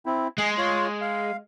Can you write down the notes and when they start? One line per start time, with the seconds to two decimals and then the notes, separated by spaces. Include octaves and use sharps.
0.06 C4 E4
0.38 G#3 G#4
0.58 F4 C#5
1.01 F5